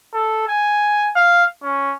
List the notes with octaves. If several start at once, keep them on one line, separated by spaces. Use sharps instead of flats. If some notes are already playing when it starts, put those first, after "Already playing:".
A4
G#5
F5
C#4